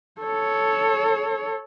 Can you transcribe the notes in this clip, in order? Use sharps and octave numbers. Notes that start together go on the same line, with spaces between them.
A4 C#5